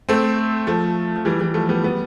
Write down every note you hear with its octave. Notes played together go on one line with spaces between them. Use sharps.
A3 C4
F3 A3
F3
E3 G3
E3 G3
F3 A3
G3 B3
G3 B3